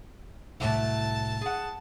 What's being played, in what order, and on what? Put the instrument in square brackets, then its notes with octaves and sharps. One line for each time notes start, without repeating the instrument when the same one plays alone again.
[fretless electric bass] C2 A2 [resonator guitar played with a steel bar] F#3 A3 E4 [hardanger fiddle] A5
[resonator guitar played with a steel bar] G#4 F#5